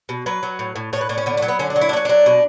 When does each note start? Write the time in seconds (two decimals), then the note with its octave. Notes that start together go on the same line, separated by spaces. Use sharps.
0.09 B2
0.26 F#3 B4
0.43 F#3
0.59 A2
0.76 A2
0.93 A2 C#5
1.01 B4
1.09 A2 D4
1.18 C#4
1.26 D3 B3
1.37 A3
1.42 F#3
1.48 B3
1.59 D3 C#4
1.70 D4
1.76 F#3
1.81 E4
1.89 D4
1.93 A3
1.97 C#4
2.05 F#3 D4
2.26 B2